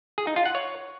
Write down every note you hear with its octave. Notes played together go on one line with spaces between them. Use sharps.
G#4
D#4
F4
F#5
C#5